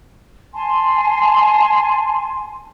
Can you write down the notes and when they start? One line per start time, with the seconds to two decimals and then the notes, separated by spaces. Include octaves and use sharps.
0.54 G#5 A5 C6